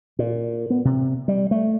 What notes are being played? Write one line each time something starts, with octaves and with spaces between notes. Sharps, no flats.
A#2
B3
C3
G3
A3